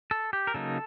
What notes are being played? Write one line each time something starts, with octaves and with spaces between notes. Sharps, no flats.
A4
G4
A#4
C#3 F#3 A#3 D#4 A4